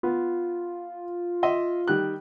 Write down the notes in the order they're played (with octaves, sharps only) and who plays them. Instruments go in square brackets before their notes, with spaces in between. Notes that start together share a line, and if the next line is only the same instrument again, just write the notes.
[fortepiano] B3 [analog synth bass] F4
[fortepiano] D#5 E5 C6
D#3 G3 F#6